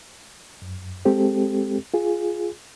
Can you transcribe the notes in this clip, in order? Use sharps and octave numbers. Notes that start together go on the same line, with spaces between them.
F#2
G#3 C4 G4 A4
F4 G#4